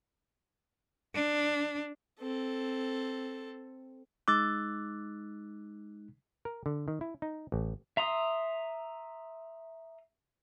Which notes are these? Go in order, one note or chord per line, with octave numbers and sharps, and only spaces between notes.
D4
C4 A4
G#3 D#4 D6 E6 F#6 A6
A#4
D3
D#3
E4
D#4
A1
E5 A#5 C6 D#6